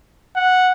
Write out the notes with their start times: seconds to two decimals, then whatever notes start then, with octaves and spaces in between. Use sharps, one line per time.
0.36 F#5